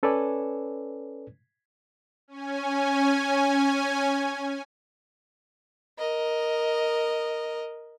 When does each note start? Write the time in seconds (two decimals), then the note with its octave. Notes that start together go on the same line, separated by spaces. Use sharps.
0.03 C#4 A4 B4 C#5 D5 G#5
2.28 C#4 G#5
5.99 A#4 D#5